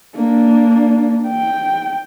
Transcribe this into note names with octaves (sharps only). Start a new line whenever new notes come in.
A#3 D4
G5